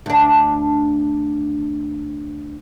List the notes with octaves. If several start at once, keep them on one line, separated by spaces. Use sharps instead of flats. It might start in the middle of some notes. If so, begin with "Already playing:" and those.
D2 D4